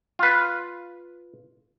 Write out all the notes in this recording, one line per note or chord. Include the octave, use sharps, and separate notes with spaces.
F4 B4